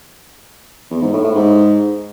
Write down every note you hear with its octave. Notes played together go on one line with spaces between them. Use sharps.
E2
G#2
A2
A2
G#2